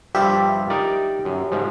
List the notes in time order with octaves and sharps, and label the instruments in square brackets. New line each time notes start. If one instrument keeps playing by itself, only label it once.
[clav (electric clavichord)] G2 F3 G3 [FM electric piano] G4 E5
[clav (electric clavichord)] D#4 A#4 D5
F#2
G#2 F3